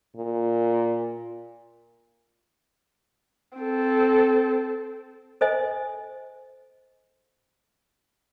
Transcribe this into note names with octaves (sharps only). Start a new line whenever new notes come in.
A#2
C4 A4
A4 C5 D#5 G#5